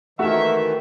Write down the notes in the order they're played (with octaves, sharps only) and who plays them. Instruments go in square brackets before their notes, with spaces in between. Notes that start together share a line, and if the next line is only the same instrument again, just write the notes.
[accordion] D#3 E3 [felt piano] A3 [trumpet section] A#3 E5 [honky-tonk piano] F#4